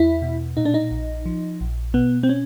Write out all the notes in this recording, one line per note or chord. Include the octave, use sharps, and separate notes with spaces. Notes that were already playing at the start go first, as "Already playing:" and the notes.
Already playing: E2 E4
B2
A#2 D#4
D4
D#4
A#1
F3
A#1
B2 B3
C4
C#4